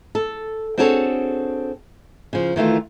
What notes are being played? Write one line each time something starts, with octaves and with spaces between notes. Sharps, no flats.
A4
C4 D4 F#4 G#4 A4 C#5
C#3 F3
D#3 E3 A3 F4